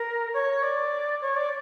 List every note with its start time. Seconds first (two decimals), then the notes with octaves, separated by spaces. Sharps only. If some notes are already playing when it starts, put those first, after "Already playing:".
Already playing: A#4
0.34 C#5
0.63 D5
1.21 C#5
1.36 D5